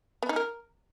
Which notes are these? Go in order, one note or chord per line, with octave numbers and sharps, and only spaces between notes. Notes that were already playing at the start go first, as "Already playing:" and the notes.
B3
D#4
A#4